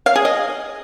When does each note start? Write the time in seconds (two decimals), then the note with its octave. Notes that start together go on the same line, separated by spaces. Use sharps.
0.06 F5
0.16 G#4
0.25 D#5